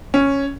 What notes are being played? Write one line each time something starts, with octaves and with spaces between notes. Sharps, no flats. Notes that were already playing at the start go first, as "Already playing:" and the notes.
C#4